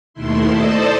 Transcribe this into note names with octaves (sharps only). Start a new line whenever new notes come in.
D#2 B2 D#3 A3 E4 C6
A4 C5 D5 D#5 A5